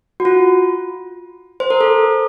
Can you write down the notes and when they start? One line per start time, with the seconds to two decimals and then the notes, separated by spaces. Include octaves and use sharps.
0.20 F#4
0.25 F4
1.60 C5
1.70 A#4
1.81 A4